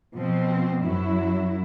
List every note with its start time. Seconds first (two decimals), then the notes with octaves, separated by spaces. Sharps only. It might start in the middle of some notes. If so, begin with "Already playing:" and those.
0.15 B2 F3 C4
0.83 F#2 F#3 E4